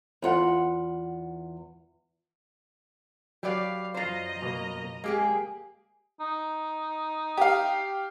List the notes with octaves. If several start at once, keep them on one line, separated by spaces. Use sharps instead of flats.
E2 F4 F#5
F#3 G4 B4 D5 F5
F#2 F4 C5 D#5 A#5
B2 A#3
G#3 A#3 G4 G#4
D#4
G4 F5